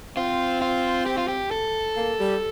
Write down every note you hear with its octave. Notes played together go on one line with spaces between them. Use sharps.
C4 F4
F4
G4
F4
G4
A4
A#3
G3